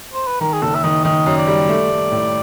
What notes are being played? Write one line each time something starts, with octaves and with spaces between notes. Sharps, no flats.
C5
B4
D#3 A#4
G#4
F#1 A4
E5
D#3 D#5
D#3 D#5
F#2
D5
G3
A3
A3
A2